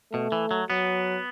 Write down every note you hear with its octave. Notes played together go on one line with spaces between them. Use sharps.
B2 A3
E3
F#3
F#3 B3